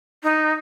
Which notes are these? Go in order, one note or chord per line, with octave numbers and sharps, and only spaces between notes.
D#4